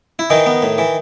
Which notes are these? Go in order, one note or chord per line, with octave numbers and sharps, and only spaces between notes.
E4
D#3 E3 D#4
B3
A2
E3